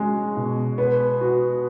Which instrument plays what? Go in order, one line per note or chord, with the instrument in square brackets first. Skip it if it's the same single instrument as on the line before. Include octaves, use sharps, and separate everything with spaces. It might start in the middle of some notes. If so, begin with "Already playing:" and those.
Already playing: [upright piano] G#3 C#4 F#4
B2
B3
F#4